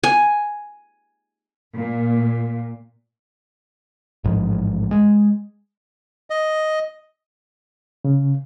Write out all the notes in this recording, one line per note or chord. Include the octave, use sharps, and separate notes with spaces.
G#5
A#2
A1 G#2 F3
G#3
D#5
C#3